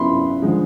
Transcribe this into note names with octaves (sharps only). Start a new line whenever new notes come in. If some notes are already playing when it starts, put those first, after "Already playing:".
Already playing: C#3 F#3 B3 E4 B5 C6
D3 F3 G#3